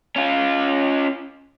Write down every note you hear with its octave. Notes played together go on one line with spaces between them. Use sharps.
C#4 F4